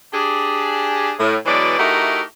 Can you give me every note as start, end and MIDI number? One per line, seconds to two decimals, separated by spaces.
0.12 1.12 62
0.12 1.12 67
0.12 1.12 68
1.19 1.35 45
1.46 1.75 47
1.46 1.75 52
1.46 1.75 54
1.46 1.75 56
1.46 1.75 74
1.78 2.21 57
1.78 2.21 63
1.78 2.21 64
1.78 2.21 66
1.78 2.21 67
1.78 2.21 70